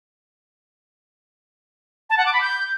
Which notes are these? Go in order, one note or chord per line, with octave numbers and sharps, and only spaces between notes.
A5
F#5
D6
B5
G6